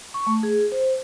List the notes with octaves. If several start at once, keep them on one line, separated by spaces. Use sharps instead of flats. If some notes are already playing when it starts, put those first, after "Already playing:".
C#6
A3
G#4
C5